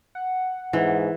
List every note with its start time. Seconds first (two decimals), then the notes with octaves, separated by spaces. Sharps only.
0.15 F#5
0.73 G#2 E3